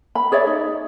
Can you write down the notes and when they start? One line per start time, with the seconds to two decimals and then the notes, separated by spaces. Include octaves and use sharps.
0.15 B5
0.32 G#4 C#5 D5 E5
0.47 D#4